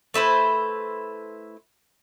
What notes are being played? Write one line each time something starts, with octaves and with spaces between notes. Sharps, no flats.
A3 E4 B4 C5